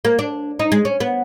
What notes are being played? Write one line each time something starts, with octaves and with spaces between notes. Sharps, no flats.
A#3
D4
D#4
G#3
C#4
B3